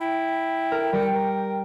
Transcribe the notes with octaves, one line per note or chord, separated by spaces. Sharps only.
E4 G5
A#4
G3 G4 A#4 C#7
A#4